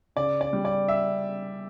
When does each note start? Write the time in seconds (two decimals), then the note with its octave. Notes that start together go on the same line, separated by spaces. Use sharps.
0.16 C#3 D5
0.41 D5
0.53 G3
0.65 D5
0.88 E5